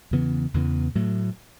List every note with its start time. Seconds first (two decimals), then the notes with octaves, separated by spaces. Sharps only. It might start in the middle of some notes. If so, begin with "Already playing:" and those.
0.11 E2 C#3 E3 B3
0.54 E2 C#3 E3 B3
0.95 A2 F#3 A3